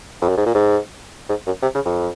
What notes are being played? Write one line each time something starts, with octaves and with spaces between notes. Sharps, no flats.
F2
F#2
G#2
A#2
G#2
G#2
F#2
C3
C#3
F2